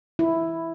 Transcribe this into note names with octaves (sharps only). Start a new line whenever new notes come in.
E4